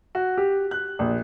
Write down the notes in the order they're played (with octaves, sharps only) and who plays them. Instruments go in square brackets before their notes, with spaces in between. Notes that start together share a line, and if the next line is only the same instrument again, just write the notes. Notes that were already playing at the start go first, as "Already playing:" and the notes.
[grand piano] F#4
G4
F#6
A#1